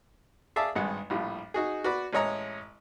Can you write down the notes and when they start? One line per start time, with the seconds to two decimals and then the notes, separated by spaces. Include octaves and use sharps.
0.56 G#4 D5 E5 F5 A5
0.75 G#1 G2 G#3 F#5
1.10 A#1 A2 G3 F4
1.54 D#4 F#4 G#4
1.84 F#4 B4 D5 B5
2.13 A1 G#3 C#5 D#5 A#5